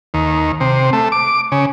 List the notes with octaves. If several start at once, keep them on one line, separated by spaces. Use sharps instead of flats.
D#2
C3
A3
D6
C#3